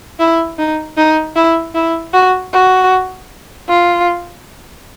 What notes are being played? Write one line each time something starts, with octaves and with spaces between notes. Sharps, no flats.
E4
D#4
D#4
E4
E4
F#4
F#4
F4